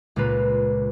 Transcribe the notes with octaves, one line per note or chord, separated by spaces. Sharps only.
C#2 A#2 A#3 F4 B4